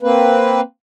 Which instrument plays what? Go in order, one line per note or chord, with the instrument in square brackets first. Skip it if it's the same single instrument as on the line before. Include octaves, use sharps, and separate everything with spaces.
[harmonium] A#3 C4 B4